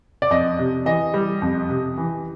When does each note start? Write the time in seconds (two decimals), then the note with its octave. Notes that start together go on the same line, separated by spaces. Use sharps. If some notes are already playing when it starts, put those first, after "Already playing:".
0.22 D5
0.30 F2 D#5
0.59 C3
0.86 E3 D#5
1.14 G3
1.42 F2
1.69 C3
1.98 E3